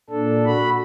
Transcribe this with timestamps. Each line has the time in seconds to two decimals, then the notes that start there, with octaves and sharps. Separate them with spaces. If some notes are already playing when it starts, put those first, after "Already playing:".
0.10 A#2 D4 A4
0.46 F#4 B5